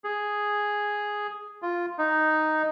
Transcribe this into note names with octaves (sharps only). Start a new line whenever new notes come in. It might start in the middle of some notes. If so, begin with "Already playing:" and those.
G#4
F4
D#4